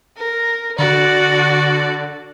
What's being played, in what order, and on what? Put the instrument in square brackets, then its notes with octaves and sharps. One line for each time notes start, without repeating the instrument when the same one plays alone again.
[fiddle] A#4
[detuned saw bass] D3 [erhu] F#4 [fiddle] D5